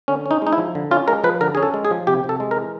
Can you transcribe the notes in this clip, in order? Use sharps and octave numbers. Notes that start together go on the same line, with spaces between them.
D3 C#4
C#4
D#4
G#3 D#4
E4
F3
D3
C#4 F4
G#3 A#4
F3 B4
D3 A#4
C#4 G#4
A4
G#3
G#4
F3
C3 G4
C3
A4
G#3
A#4
E3